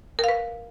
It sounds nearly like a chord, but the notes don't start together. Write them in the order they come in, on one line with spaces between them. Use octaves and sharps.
A#4 F5 B4